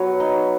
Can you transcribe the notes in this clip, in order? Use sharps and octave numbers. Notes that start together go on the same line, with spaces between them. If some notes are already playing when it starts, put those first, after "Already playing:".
Already playing: F#3 B3 B4 C#5
D#4